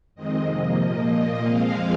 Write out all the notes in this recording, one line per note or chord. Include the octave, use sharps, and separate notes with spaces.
F2 D#3 G#3 C4 D#5
C3 F3 A#3 D#5
A#2 F3 A#3 D#5
A#2 A#3
F2 F3 G#3 C4 F5